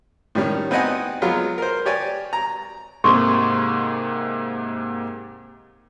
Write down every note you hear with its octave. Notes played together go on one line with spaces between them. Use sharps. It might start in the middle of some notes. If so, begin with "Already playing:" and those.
A2 D#3 G3 C#4
B3 C4 D#4 D#5 F#5 G#5
F#3 G#3 B3 F4
A#4 C5
G4 C#5 D5 G#5
A#5
G#2 C3 A#3 A4 C6 C#6